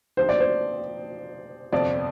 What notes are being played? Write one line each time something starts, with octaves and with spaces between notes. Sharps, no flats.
D3 F3 C4 D#4 G4 C5
D5
C5
G1 F2 C3 F3 C4 D5